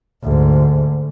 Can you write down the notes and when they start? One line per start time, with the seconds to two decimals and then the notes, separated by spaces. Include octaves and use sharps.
0.24 D2 G#2